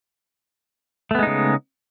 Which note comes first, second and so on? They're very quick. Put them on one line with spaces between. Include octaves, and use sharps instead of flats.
A3 B3 G#3 D#4 C#3